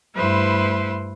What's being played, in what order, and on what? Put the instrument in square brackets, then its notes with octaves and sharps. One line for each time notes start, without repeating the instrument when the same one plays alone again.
[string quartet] G2 A3 E4 B4 C5 C6